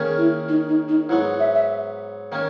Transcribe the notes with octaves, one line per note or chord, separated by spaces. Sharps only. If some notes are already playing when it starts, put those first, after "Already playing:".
Already playing: D#3 A#3 C#4 G#4
E4
D#4
D#4
D#4
G#2 F#3 B3 E4
E5
E5
D#3 A#3 C#4